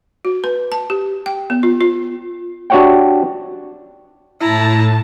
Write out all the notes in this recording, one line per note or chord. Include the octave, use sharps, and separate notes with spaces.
F#4
B4
A5
G4
G5
B3
F4
F4
D4 F#4 G4 C#5 F#5 G5
A2 E4 A5 A#5